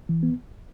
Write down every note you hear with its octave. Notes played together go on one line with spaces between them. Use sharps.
E3
B3